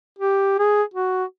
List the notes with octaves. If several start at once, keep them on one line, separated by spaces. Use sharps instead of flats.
G4
G#4
F#4